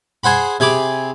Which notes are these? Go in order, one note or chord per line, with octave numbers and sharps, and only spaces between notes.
G#4 C5 F#5 B5
C3 G#4 B5 D6